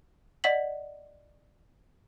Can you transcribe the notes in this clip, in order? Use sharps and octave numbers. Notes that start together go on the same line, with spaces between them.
D5 D#5 F#5 B6 F#7